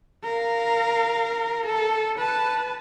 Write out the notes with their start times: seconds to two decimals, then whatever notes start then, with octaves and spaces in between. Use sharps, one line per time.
0.24 A#4 F5
1.65 A4
2.18 B4 A5